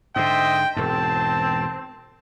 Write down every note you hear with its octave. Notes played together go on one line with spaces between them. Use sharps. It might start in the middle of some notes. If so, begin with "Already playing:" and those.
G#2 D3 C5 D#5 E5 G5
E1 G#2 C4 A5